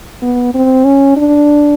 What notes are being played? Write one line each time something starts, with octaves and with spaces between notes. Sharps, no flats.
B3
C4
C#4
D4